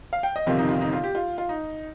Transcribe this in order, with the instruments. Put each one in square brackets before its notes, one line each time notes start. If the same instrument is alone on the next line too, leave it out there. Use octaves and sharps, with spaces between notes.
[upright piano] F5
G5
D#5
G1 F2 C3 D#3 F4
D#4
F4
D#4
F4
G4
F4
F4
D#4